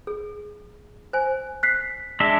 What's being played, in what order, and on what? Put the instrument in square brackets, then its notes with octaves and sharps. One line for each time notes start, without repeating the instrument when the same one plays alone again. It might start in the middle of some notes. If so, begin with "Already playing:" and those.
[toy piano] G#4
C5 G#5
[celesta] F#6 B6 C7
[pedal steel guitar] G#3 D4 E5